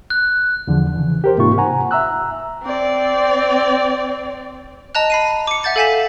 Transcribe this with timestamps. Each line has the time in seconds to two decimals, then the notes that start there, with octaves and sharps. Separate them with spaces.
0.10 F#6
0.67 E2 D3 F3
0.95 C#3 E3
1.24 G4 A#4 C5
1.37 G#2 C3 A#3 D#4 F4 C#6
1.58 F#5 G#5 A#5
1.91 E5 A#5 E6 F#6
2.64 C4 D5
4.95 D#5 A5 A#5 F#6
5.10 B5 C7 D#7
5.47 D6 C#7
5.63 E5 F#5 G6 A6 C#7
5.76 A4 F5 G#5 G6 B6 E7